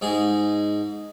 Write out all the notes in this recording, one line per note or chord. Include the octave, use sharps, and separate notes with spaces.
G#2 D#4 G#4